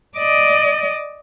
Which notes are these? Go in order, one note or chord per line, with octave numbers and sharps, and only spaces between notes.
D5 D#5